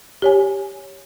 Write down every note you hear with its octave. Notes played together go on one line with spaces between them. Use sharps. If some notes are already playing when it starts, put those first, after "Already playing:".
G4 C#5 G#5